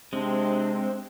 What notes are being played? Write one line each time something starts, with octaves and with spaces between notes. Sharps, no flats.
C3 G#3 C4 D4